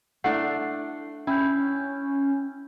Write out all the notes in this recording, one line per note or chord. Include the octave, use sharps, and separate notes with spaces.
A3 D4 E4 F#5 C7
C#4 E4 G5 G6